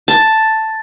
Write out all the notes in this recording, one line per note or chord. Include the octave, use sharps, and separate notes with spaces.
A5